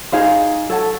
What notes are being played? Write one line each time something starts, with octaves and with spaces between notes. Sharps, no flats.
D#4 G#4 C5 F5
A4 C#5 F#5 A5